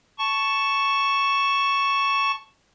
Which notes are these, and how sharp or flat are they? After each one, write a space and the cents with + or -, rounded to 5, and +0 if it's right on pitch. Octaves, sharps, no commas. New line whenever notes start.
A5 +0 C#6 +0